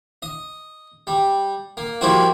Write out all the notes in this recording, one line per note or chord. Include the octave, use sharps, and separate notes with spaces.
D#5
G3
A#3
F3 G3 A#3 C4 E4 F#4